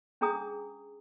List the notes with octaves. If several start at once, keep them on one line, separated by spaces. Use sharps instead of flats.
C#4 D4 G#4 A#5 D#6